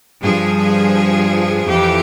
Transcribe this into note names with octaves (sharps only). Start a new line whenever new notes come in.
G2 F3 G#4
F2 E3 G4